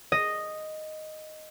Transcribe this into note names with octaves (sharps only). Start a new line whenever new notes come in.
D#5